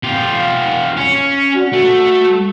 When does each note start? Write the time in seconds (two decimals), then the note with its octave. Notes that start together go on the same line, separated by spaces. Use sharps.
0.04 F4 G4
0.97 C#4
1.55 F#4
1.73 A3